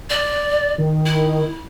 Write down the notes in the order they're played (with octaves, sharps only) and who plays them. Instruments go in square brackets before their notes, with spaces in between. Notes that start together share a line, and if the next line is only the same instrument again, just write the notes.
[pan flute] D5
[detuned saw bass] D#3
[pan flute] E4